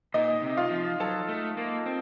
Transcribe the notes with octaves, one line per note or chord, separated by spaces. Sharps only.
A#2 D#4 D#5
C3
F4 F5
F3
F#3 A4 A5
A3
A#3
C4